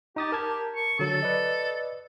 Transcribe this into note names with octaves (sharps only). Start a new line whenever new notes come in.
D#4 G4 D#6 A6
A#4 A5 G#6
C#6
D3 F#3 A4
B4 D5 D#5